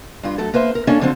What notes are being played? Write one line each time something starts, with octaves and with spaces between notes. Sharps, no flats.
G2 F4
F#3 A3 A4
A#3 B4 C5 E5
A#4
A#3 C#4 D4 A4
D3 F3 F#3 C4